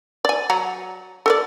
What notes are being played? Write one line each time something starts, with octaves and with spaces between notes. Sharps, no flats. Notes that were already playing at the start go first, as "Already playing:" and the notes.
D5 G#5
F#3 F#5 A#5
A4 A#4 D5